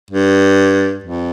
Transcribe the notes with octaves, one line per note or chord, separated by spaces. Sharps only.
G2
F2